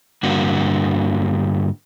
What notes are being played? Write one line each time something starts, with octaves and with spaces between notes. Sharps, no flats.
G2 D3 A#3 F#4